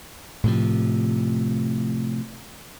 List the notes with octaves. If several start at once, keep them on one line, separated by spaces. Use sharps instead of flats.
A2 C3 F3